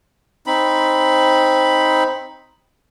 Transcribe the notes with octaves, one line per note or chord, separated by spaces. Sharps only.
C4 D#4 B5